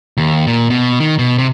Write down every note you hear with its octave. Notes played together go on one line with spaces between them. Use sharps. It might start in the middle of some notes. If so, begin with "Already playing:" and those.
D#2
A#2
B2
D#3
B2
C3